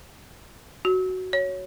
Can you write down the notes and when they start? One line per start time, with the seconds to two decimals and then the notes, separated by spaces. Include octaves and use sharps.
0.85 F#4
1.33 C#5